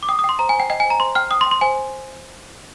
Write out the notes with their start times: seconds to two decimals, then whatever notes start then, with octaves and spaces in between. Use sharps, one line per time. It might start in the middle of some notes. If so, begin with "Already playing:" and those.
0.03 D6
0.09 G5 D#6
0.19 D#6
0.24 G5 C6
0.39 C5 A#5
0.49 G#5
0.54 C5
0.60 G5
0.70 D#5 G5
0.80 G#5
0.85 C5
0.90 A#5
1.00 C5 C6
1.15 G5 F6
1.31 G5 D#6
1.41 C6
1.46 G5
1.51 C6
1.61 C5 G#5